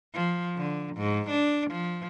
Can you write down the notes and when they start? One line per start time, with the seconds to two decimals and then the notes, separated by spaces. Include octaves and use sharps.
0.14 F3
0.56 D3
0.97 G#2
1.30 D4
1.71 F3